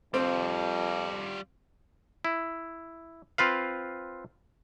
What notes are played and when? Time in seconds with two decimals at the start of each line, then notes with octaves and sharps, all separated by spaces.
0.14 F2 G3 C4 F4
2.25 E4
3.38 C4 F4 B4 F5